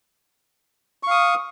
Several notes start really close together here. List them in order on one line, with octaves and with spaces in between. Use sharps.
C#6 F5 D#6